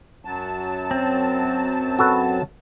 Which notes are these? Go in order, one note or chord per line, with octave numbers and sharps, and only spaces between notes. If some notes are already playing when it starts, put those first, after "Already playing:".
F#2 F#3 A5
C4
F#4 A4 B4